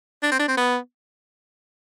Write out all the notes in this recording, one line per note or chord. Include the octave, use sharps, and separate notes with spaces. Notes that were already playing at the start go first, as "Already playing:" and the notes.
D4
C4
D4
C4
B3